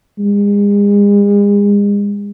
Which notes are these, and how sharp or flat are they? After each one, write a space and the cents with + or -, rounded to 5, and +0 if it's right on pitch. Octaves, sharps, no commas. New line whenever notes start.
G#3 -40